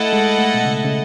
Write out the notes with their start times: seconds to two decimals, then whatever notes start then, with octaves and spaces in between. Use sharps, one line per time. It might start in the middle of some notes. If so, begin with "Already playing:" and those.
Already playing: A3 E4 A4 D#5 F#5 A5
0.13 G#3
0.39 A3
0.54 B2
0.65 C#3
0.84 C#3